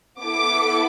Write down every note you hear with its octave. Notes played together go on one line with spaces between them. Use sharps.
B3 E4 A4 D6